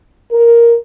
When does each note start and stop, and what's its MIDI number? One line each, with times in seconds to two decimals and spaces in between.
0.31 0.76 70